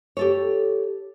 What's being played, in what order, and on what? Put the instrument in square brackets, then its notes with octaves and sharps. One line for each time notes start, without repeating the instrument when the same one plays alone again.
[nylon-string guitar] G4 A4 C#5